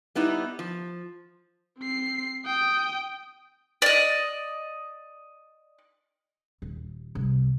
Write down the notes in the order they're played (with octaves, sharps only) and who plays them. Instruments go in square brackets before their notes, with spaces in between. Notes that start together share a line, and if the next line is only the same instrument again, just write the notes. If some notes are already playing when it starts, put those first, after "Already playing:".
[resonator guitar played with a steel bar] G3 B3 D#4 E4
F3
[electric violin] C4 C7
G5 D#6
[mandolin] D5 D#5
[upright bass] D#1
C2